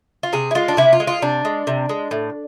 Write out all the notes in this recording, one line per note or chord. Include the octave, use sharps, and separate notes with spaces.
F4
C3 G#4
E4
G#3 F4
D4
C3 E4
F4
G#3
F4
C3 D4
G#3
C3
G#3
A2